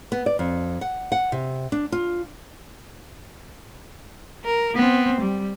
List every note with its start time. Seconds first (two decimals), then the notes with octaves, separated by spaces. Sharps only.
0.12 B3
0.26 D5
0.39 F2
0.81 F#5
1.12 F#5
1.32 C3
1.72 D4
1.92 F4
4.45 A#4
4.75 B3 C4
5.21 G3